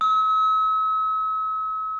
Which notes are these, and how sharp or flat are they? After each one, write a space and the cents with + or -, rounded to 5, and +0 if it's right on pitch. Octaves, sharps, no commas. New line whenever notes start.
E6 -45